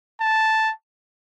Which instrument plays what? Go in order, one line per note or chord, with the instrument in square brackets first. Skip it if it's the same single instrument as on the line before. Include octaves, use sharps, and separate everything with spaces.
[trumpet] A5